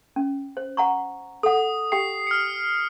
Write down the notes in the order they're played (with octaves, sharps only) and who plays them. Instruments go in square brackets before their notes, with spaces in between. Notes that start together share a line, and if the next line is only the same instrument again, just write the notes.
[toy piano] C#4
C5
F#5 A#5 C#6
[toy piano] A4 F#5 [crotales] D#6
[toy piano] G4 G5 [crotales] C7
[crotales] F6 C#7